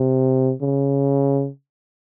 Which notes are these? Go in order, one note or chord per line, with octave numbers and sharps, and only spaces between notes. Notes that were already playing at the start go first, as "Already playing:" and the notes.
Already playing: C3
C#3